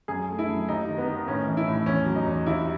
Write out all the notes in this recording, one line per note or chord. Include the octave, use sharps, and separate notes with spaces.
F#2 G#4
A3
E4
F#2
D#2 D#4
D#3
B3
D#3
A2 C#4
E3
E4
A2
E2 C#4
F#3
D#4
E2
D#2 E4